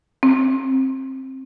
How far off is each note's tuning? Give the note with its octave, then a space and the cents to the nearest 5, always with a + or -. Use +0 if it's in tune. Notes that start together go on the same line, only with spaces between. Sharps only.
C4 +20